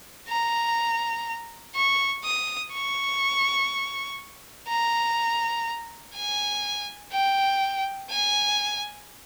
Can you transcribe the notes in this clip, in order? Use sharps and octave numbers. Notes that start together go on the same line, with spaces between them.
A#5
C#6
D#6
C#6
A#5
G#5
G5
G#5